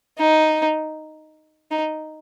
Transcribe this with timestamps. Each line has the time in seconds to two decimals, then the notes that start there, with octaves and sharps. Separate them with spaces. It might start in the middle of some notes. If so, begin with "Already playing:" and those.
0.18 D#4
1.71 D#4